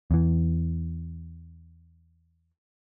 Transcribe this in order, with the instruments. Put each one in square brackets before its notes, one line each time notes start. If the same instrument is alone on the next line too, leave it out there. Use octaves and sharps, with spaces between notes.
[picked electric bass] E2 E3